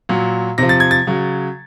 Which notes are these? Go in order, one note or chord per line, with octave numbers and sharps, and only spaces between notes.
A#2 F#3
C3 F3 A#6
A6
G#6
A6
C#3 F#3